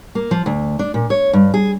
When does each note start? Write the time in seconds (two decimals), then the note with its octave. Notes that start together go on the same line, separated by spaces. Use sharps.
0.15 A#3
0.31 F3
0.46 D2
0.79 D4
0.94 A#2
1.10 C#5
1.33 G2
1.54 G#4